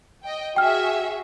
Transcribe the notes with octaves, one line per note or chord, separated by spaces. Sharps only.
D#5 G5
F#4 G#4 E5 G5 F6